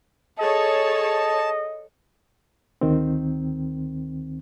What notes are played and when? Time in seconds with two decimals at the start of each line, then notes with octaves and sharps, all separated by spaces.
0.39 G#4 A4 C#5 D#5 A5
2.81 D2 D#3 C4